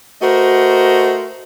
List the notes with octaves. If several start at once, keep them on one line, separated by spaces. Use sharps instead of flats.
A3 F#4 A#4 C5 D#5